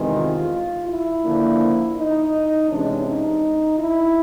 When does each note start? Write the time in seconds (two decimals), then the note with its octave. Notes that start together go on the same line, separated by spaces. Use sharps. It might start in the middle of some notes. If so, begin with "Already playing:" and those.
Already playing: E2 C3 D#3 G#3
0.15 F4
0.88 E4
1.23 D3 F3 A#3 D4
1.97 D#4
2.69 C3 E3 G#3 C#4 D4
3.05 D#4
3.77 E4